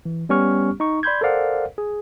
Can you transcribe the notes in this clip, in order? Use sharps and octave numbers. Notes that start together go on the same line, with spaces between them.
E3
G3 B3 C#4 G4 C#6 F6
D#4 C#6
D5 B5 C6 G6 G#6
A4 A#4 C5 D5 F5 F#5
G#4